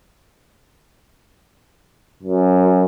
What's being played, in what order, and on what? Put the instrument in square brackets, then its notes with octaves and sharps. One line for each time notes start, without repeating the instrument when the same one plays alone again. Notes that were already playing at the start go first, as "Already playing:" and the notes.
[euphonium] F#2